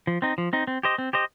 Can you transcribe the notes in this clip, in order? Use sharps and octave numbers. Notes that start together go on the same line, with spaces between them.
F3
C4 D#4
F3
C4 D#4
C4
G4 C5 D#5
C4
G4 C5 D#5